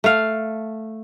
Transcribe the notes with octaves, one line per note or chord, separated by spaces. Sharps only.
A3 F5